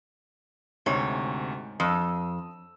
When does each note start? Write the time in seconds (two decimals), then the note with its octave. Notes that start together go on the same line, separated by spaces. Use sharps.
0.86 D2 G#2 C3 C#5
1.80 F2 D#6 E6